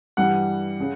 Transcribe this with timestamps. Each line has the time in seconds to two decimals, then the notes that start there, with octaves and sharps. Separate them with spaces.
0.17 G2 E3 G3 F#5
0.80 C#3